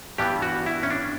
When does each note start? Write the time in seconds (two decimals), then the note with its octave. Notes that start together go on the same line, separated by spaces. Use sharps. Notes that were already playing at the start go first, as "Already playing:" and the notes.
0.18 G2 E3 G3 B3 G4
0.42 F#4
0.66 E4
0.83 C#4
0.91 D4